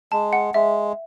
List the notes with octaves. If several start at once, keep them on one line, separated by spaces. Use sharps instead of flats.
G#3 A5
F#5
G#3 E5